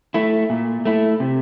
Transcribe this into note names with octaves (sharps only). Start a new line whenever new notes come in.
A3 E4
A#2
A3 E4
C3